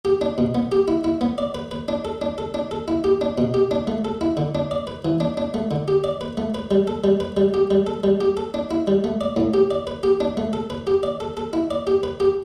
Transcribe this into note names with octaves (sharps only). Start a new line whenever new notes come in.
G4
D4
B2
B3
G4
E4
E4
B3
D5
B4
B4
D4
A4
D4
A4
D4
A4
E4
G4
D4
B2
G4
D4
A3
A4
E4
D3
D4
D5
B4
E3
D4
D4
A3
D3
G4
D5
B4
A3
B4
G3
A4
G3
B4
G3
G4
G3
A4
G3
G4
A4
D4
E4
G3
A3
D5
A2
G4
D5
B4
G4
D4
A3
A4
B4
G4
D5
A4
A4
E4
D5
G4
B4
G4